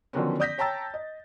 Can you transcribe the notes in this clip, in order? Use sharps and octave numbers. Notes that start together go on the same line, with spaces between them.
D3 D#3 F3 F#3 B3 C#4
D5 D#6 G6 A#6 B6
C#5 G5 A5 A#5 E6 A6
D#5